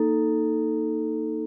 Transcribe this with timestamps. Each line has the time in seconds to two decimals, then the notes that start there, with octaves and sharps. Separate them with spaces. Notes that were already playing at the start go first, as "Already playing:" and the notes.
Already playing: A#3 D#4 A4